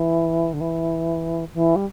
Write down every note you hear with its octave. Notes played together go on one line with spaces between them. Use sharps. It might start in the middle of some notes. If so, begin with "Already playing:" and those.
Already playing: E3
D3
E3
E3
G3